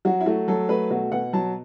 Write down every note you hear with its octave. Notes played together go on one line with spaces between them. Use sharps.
F#3 F#4
E4
A3 F#4
F#3 A4
A3 B4
B2 F#4
B2 F#5
F#3 A5